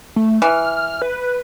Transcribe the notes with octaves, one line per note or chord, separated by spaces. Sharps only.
A3
E3 F6
B4